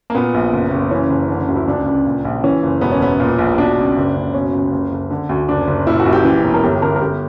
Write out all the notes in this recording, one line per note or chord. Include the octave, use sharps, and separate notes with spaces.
A#3
A#2 B3
A#1
F#1
F#1
E3 C#4
F#1
D3
D2
E4
C#2 D4
C#2
A#2
A#1
E3 C#4
F#1
E1 B3
C#4
E1 B3
A#2
A#1
B2 D4
C#2
F#1
F#1
B2 C#4
C#2
F#1
F#1
D3
D2
F#1 D4
F#1
A#2 E4
F#4
A#1
G4
E3
E1
A#4
G1 G4
G4
G1 A#4
A#4
G1 G4